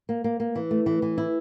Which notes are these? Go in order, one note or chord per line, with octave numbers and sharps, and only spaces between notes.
A#3
A#3
A#3
E3
A3
E3
E3
E4